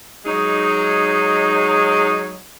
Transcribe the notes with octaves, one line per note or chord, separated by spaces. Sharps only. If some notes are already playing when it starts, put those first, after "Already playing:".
F#3 G#3 D#4